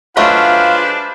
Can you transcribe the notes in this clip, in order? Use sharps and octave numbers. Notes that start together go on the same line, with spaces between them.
F#3 G#3 A3 D4 F4 B4 C5 F5